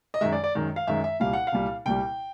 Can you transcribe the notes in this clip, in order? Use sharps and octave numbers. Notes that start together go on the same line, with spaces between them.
D#5
F#2 D#3 G#3 E5
D5
D5
F#2 D#3 G#3
F5
F#2 D#3 G#3 E5
E5
C2 A#2 G3 F5
F#5
F5
C2 A#2 G3
C2 A#2 G3 G5